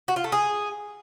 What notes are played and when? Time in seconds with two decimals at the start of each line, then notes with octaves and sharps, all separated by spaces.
0.08 F#4
0.16 F4
0.24 A3
0.32 G#4